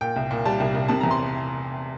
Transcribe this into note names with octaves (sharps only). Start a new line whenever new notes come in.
A#2 G5
C2
A#2
G3 A5
C2
C2
C3 A5
E2 A#5
C6